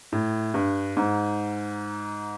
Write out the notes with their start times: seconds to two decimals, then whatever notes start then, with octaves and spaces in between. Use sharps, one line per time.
0.12 A2
0.54 G2
0.97 G#2